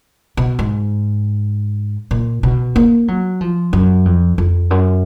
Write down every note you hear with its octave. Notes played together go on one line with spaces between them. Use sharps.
B2
G#2
A#2
B2
A#3
F#3
F3
F#2
F2
F2
F#2